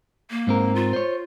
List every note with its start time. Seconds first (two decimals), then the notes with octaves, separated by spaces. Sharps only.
0.30 A#3
0.47 G#2 C4 A#4
0.75 F4
0.93 C5 C#5